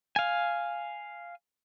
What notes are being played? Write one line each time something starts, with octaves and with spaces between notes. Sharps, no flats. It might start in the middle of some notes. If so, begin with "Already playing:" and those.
F5 G#5